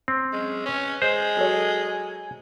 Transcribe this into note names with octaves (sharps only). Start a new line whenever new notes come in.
C4
F#3 G#3 C#4
C#4 B4 C#5
G#3 C5 G#5
F#3 A4 C#5